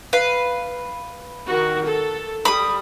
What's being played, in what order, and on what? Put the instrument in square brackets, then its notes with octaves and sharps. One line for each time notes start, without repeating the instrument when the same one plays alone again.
[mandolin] B4 F5
[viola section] D#3 F#4
A4
[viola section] G3 [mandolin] B5 D#6